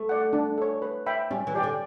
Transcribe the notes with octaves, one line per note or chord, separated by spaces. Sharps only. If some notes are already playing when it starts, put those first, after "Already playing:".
Already playing: A3
D5 F#5
D4
A4 C#5
B4
E5 G5 B5
G3 C#4
E3
G4 D5 G5
D3